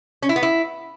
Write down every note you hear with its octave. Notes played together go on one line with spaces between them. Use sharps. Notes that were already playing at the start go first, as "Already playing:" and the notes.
C#4
E4
B3
E4